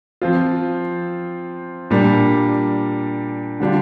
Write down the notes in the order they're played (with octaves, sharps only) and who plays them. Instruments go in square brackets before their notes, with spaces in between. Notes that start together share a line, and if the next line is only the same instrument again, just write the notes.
[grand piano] F3 C4 F4
A#2 G3 D4
D3 G3 D4 F4